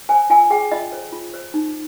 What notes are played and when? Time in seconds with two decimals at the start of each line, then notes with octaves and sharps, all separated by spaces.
0.09 C5 G#5
0.30 F4 G#5
0.50 G#4 G5
0.72 F4 D#5
0.92 C5
1.12 F4
1.34 C5
1.54 D#4